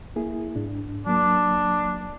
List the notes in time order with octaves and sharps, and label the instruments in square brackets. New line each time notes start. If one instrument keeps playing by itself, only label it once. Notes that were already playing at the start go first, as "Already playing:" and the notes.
[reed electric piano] A#3 E4 G#4
G#2 D4
[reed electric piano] F#3 A#3 [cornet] D4